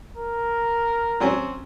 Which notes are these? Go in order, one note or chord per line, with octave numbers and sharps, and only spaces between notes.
A#4
F#3 C4 C#4